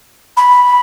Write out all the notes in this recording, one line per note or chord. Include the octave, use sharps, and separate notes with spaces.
B5